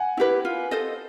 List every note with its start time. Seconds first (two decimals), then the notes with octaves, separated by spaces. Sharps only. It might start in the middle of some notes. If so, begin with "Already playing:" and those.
Already playing: F#5 G#5
0.17 E4 G4 B4
0.45 F4
0.71 A4 C5 D#5